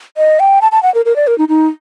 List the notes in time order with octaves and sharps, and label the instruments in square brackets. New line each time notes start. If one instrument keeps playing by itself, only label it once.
[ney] D#5
G5
A5
A5
F#5
A#4
A#4
D5
A#4
D#4
D#4